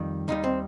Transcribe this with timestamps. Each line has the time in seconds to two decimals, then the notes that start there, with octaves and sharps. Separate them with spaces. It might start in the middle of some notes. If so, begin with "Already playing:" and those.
Already playing: F2 D#3 G3
0.28 D#2 D#3 G3 D#4
0.44 C4